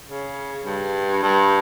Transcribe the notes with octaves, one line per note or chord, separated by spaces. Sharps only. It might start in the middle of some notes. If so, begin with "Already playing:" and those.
C#3
G2
G2